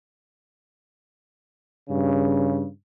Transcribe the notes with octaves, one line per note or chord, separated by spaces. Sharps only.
G2 C#3